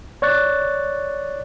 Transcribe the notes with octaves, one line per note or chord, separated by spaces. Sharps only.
C#5 D5 C#6 F#6 A6